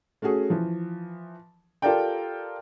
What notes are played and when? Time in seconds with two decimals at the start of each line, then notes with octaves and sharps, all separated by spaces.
0.22 A3 C#4 F#4 G#4
0.50 E3 F3
1.82 F4 G4 A4 A#4 D5 G5